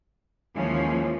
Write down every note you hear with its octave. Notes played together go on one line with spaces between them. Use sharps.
D#2 E3 F3 G#3 C#4